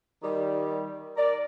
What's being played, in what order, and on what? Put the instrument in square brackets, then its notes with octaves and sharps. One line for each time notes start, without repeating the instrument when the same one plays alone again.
[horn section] D#3 G3
A#4 D5